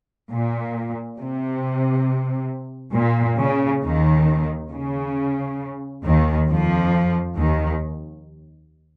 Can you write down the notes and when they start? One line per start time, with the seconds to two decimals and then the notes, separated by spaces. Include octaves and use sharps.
0.30 A#2
1.19 C3
2.95 A#2
3.39 C#3
3.83 D#2 D#3
4.71 C#3
6.04 D#2 D#3
6.48 F2 F3
7.37 D#2 D#3